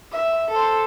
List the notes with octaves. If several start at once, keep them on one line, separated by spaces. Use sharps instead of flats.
E5
A4 C5